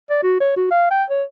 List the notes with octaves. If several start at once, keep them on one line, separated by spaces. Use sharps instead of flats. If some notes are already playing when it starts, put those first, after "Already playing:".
D5
F#4
C#5
F#4
F5
G5
C#5